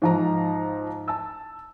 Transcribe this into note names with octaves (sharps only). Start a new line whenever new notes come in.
G#2 F3 A#5
A5 E6